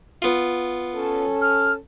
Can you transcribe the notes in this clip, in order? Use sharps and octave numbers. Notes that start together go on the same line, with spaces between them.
B3 F4
C#4 A4
F6